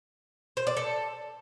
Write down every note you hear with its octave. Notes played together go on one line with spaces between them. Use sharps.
C5
D5
A4